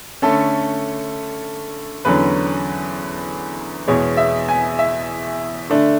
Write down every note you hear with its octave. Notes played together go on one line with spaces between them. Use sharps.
D3 A3 C#4 A4
E2 D3 F#3 C#4 B4
E2 B2 G#3 C#5
E5
G#5
E5
D3 A3 D4